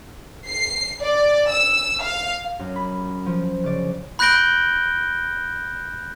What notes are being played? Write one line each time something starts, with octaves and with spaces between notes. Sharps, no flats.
C7
D5
E6
F5
F#2
B5
F3
C#3 D5
B5 F#6 G6 A#6 D7 G7